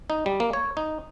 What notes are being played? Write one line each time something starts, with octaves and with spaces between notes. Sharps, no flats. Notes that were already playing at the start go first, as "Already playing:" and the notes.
D#4
G3
A#3
C#5
D#4